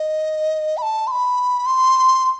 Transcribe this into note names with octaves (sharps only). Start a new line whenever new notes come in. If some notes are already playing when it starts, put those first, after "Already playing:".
Already playing: D#5
B5
A5
C6
B5
C6